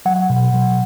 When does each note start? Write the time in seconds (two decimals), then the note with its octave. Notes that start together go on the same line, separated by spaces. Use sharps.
0.05 F#3 F#5
0.30 B2
0.54 F#3